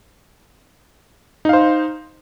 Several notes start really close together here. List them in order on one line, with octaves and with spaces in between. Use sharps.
D#4 F5 C5